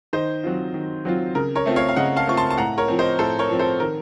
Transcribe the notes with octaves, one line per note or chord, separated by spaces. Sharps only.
D#3 C5 D#5
F#3 C4 F4
D#3
F#3 C4 F4
C#3 A#4
A#4 C#5
A3 C4 F4
C#5 F5
F5
C#3 D#5 F#5
F5 A5
A3 C4 F4 C#6
A5 C6
A5
A2 F#5 A#5
A#4 C#5
F3 C4
C5 D#5
A2 A4 C5
A#4 C#5
F3 C4
A4 C5
D#3 A#4